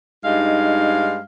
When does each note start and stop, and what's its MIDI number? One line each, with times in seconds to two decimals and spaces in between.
0.25 1.20 43
0.25 1.20 56
0.25 1.19 63
0.25 1.20 77